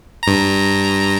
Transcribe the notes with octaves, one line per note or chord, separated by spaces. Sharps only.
G2 A#5